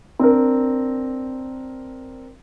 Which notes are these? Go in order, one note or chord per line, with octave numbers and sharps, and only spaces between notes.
C4 D4 A#4